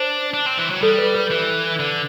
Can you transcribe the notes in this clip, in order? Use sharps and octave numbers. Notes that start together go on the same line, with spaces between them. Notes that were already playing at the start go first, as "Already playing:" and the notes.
Already playing: D4 C5
D4
C4
E3
F#3
G3 A4
B4
B4
E3
D3